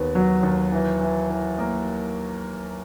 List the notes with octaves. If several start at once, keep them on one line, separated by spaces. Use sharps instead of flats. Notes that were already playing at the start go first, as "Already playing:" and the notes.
Already playing: D#2 B3
F#3
D#2
E3
E3
E3
A#3